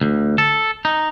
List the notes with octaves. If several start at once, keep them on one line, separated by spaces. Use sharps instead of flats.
D2
A4
D#4